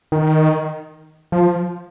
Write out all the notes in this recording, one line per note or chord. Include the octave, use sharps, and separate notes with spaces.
D#3
F3